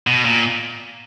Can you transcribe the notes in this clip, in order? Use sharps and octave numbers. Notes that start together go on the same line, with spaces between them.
B2
A#2